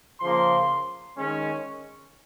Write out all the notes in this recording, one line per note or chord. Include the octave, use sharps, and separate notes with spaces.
C#3 F3 A#3 C6
D#3 G#3 C#4